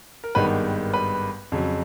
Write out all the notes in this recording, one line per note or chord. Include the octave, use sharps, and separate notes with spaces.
A#4
G#1 G2 D#3 G#3 B3 B4
B4
F2 C#3 F#3